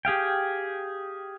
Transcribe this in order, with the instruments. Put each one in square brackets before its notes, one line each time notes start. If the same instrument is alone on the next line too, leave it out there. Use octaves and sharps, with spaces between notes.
[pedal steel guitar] G4 G#4 F5 G5